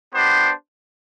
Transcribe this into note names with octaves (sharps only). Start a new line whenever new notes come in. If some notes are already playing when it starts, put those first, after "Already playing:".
B3 D4 G4 C5